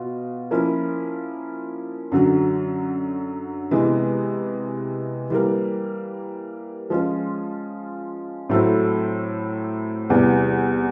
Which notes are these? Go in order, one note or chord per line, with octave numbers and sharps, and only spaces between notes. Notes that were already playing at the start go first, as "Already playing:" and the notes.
Already playing: B2 F4
F3 A#3 C#4 E4
F#2 D3 F#3
C3 E3 G#3 B3
E3 G3 A#3
F3 G#3 C#4 F4
A2 F#3 A3 C4 E4
E2 C3 E3 G3